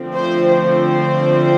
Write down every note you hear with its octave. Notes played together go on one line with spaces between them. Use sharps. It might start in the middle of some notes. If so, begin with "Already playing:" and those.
Already playing: D3 F3 A3 C4
C5
C5